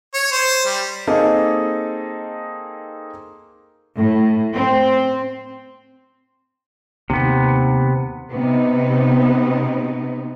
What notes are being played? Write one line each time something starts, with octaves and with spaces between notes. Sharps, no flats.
C#5
C5
G3
A#3 C4 D#4 G#4 A4 D#5
A2
C4
D#2 C3 B3
C3 B3 D#4